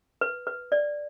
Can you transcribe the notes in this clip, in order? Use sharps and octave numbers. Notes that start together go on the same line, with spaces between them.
B4
B4
D5